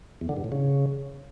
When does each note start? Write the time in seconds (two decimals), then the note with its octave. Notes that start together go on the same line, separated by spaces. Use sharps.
0.21 E2
0.29 D3
0.37 G2
0.44 A2
0.52 C#3